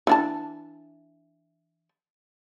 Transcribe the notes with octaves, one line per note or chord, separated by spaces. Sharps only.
E3 D4 A5